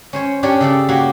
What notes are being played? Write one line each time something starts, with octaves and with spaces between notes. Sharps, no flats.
C#4 C5 C#5
C#4 D4 G4 A#4 C#5 D5
C#3 A4 D5
A#3 F#4 G4 C#5